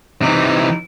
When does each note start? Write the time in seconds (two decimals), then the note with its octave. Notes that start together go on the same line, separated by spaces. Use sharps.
0.22 C3 E3 D#4